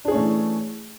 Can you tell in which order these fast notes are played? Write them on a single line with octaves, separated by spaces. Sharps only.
D4 G#4 C#4 A3 E3